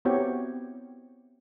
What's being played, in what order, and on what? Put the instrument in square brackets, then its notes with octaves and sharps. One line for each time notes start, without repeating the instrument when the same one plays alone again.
[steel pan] B3 C4 E4 F#4 G4 C#5